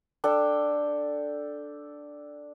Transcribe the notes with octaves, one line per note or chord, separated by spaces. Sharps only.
D4 A4 G5